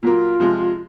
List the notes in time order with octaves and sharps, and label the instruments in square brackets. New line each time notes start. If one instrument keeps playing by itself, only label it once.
[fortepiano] A#2 F#3 A#3 [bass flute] F4
[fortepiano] C3 F3 G#3